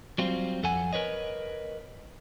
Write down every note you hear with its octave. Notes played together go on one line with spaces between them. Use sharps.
F#3 G3 C4 F4
F2 A4 F#5 G#5
A#4 B4 C#5 D#5